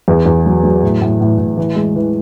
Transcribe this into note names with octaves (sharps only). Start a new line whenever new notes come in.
E2
E2
F#3
F#3
A2
A2
A2
A2
E3
G#3
E3